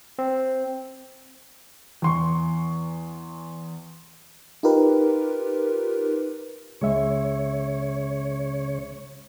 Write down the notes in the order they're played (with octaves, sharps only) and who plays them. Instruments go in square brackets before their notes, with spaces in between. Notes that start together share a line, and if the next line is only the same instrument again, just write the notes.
[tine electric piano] C4
[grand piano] E2 C6 C#6
[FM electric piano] D#4 F4 G4 A#4 B4
[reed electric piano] C#2 G#3 E5 [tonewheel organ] C#3 C#5